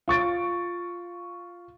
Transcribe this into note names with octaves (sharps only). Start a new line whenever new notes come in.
F4 C#6 A6 D7